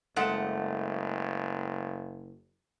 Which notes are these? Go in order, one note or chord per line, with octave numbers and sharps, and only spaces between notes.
F#1 G#3 A3 F#5